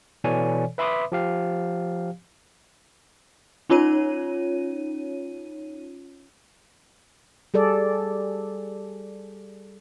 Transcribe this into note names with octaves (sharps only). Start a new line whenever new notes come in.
B2 E3 A4 C#5 D5 G#5
B4 E5 B5 C6 D6 D#6
F3 G4 F5
C#4 D#4 F4 C#5 D#7
G3 G#4 A4 D5